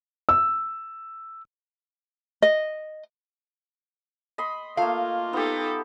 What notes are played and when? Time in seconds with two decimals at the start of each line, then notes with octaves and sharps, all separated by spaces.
0.29 E6
2.42 D#5
4.38 D#5 B5 C6
4.77 A3 A#3 F4 F5
5.33 B3 D#4 G4 A4